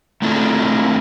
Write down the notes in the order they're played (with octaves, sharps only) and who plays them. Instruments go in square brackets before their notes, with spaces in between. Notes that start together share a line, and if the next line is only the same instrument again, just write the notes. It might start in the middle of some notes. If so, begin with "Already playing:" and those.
[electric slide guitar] A3 C4 D4 E4 F4 A4